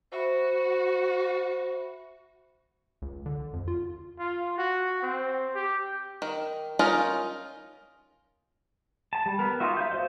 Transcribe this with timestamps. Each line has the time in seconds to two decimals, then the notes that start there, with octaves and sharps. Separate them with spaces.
0.12 F#4 C5 E5 B5
3.02 C#2
3.26 D3
3.53 F2
3.68 F4
4.19 F4
4.58 F#4
5.02 C4
5.55 G4
6.22 D#3
6.79 C#4 D#4 F4 A#4 D#5
9.13 A5
9.26 G3
9.39 B3 A#4
9.60 D#4 F4 F#4 E5
9.77 E5 F5 G6
9.92 F#4 C5 D#5